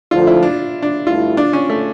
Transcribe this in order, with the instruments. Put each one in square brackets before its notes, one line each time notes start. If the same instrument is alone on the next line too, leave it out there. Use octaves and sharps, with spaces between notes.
[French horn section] D2 D3 F3 [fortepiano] F4
[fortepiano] E4
D4
D4
[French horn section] G2 D3 A3 E4 [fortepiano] F4
[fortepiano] D4
C#4
A3